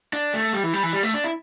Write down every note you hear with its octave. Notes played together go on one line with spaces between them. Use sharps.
D4
A3
G3
E3
G3
E3
G3
A3
D4
E4